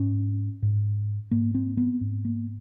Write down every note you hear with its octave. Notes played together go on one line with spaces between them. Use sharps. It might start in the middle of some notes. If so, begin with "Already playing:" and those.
Already playing: G#2 C#4
G#2
G#2 A#3
C4
B3
G#2
A#3